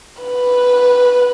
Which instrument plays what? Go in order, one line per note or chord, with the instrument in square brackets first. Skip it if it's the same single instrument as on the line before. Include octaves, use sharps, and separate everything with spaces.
[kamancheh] B4